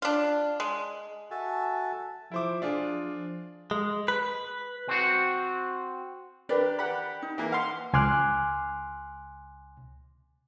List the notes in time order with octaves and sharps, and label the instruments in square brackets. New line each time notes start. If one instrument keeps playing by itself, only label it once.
[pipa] D4 F4
G#3
[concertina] F#4 A4 E5 G#5 A5
[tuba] F3 [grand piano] E4 C5 D6
[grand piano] D4 F4 G#4
[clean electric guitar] G#3
B4
C4 F#4
[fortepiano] D4 G4 [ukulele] A#4 B4 D5
[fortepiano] G4 F#5 B5
[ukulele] D#4
[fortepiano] E3 A#3
[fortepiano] F5 C6 [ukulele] F#5
[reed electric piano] C#2 G#5 C6 D6 F6 F#6